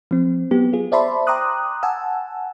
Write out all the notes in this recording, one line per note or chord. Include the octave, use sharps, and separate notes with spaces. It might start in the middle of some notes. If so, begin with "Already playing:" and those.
F3 C4
F#3 B3 G4
F4 G#4
C5 D5 E5 A5 B5 C6
G5 A#5 C6 D6 D#6 F#6
F#5 G#5 A5 E6